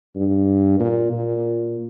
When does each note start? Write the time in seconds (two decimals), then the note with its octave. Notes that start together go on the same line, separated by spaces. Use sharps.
0.16 G2
0.80 A#2
1.12 A#2